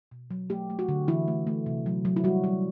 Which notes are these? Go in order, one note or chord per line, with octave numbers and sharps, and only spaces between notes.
B2
F#3
A3 G4
A3
F#4
D3
E3 E4
A3
A3
C3
F#3
F#3
E4
G3 F#4
G3